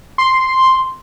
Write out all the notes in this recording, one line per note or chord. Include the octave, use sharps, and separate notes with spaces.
C6